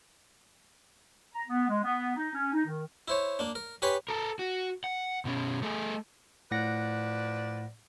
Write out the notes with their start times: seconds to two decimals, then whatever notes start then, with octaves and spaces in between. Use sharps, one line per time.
1.33 A#5
1.47 B3
1.68 G#3
1.82 B3
2.16 D#4
2.34 C#4
2.53 D#4
2.66 D#3
3.08 E4 C5 C#5
3.39 A#3 D4
3.55 A#4
3.82 G4 B4 C#5 G#5 B5 C6
4.09 A4 A#4
4.39 F#4
4.84 F#5
5.25 B2 C#4
5.62 A3 G#4
6.51 A2 F3 B4 D5 F#5 A#6